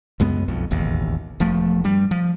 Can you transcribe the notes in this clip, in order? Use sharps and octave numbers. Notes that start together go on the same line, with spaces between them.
C#2 F#2 G#3 B3
B1 F2
E1 A1 D#2
E1 F3 A3
G2 G3
F3